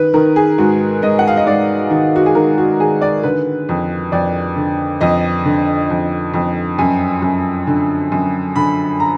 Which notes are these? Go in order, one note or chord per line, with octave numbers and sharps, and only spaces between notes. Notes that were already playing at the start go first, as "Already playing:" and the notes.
Already playing: D#3 B4
D#3 A#4
G#4
G#2 F#4
G#2 D#5
F#5
F5
D#5
G#2 D5
D#3
F#4
G#4
D#3 A#4
F#4
D#3 G#4
D5
D3 B4
F2
F2 D5
D3
F2 D#5
D3
F2
F2
F#2 G#5
F#2
D3
F#2
D3 B5
A#5